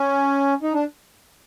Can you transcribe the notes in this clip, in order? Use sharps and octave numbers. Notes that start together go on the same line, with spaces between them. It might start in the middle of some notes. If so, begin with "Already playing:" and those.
Already playing: C#4
D#4
D4